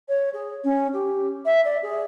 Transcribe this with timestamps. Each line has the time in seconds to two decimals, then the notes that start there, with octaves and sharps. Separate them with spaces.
0.08 C#5
0.33 G#4
0.64 C#4
0.93 G4
1.45 E5
1.64 D5
1.82 G#4